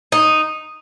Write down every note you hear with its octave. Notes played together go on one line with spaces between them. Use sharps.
D#4